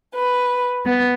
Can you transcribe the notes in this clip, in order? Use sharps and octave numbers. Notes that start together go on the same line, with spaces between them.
B4
B3